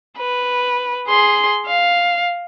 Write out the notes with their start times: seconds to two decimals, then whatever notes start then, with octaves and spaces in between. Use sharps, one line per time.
0.17 B4
1.08 G#4 C6
1.67 F5